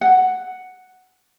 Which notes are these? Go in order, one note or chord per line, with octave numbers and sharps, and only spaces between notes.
F#5